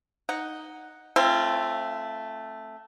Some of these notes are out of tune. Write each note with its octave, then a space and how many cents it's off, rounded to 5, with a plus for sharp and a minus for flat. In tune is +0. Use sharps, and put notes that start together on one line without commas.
D#4 +0 F#5 +0
A3 +0 C4 +25 F4 -25